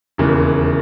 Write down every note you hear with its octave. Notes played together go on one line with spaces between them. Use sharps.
E1 D#2 C#3 E3